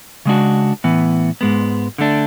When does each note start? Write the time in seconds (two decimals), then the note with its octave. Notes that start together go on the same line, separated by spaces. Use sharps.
0.25 C#3 G#3 D4 F#4
0.84 A2 E3 B3
1.41 G#2 G#3 B3
1.98 D3 A3 D4